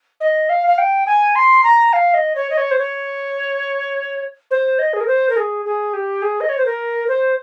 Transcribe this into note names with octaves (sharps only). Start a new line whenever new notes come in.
D#5
F5
F5
G5
G#5
C6
A#5
F5
D#5
C#5
D#5
C#5
C5
C#5
C5
D#5
G#4
A#4
C5
A#4
G#4
G#4
G4
G#4
D#5
C#5
C5
A#4
C5